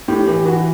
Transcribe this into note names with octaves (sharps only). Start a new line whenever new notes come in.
A2 G4
E3 G4
E3 F#4